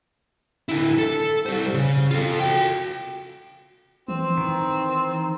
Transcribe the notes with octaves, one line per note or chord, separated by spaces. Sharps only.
D3 E4
A4
G3 C5
C#3
F4 A4
F#4 G5
E3 C4
D#3